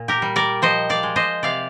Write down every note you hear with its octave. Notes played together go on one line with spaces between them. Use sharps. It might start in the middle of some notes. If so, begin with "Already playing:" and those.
Already playing: A#2
G4 A#4
G3
A#4 D5
F3 C5 D#5
D5 F5
G#3
C5 D#5
C3 D5 F5